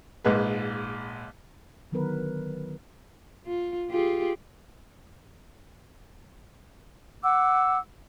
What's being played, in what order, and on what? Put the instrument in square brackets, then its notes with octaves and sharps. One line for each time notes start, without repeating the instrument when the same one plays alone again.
[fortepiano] A#1 G#2 G#3 B4
[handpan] D3 D#3 F#3 B3 A#4 B4
[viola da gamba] F4
F4 G4 G#4
[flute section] F#5 D6 E6